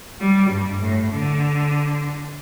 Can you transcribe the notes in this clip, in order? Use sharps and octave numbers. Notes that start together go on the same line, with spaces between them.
G3
G2
A2
D3